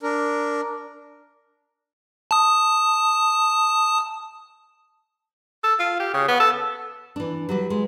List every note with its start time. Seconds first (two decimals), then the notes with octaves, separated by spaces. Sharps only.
0.03 D4 A#4
2.31 A5 D#6
5.64 A4
5.80 F4
6.00 G4
6.14 C#3
6.28 B3
6.40 A4
7.16 E3 D4
7.49 F#3 G3 B4
7.70 G#3